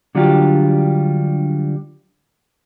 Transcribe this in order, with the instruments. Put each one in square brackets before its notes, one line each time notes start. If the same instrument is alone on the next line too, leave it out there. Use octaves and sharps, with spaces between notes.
[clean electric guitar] D3 F#3 G3 D4 F4 G4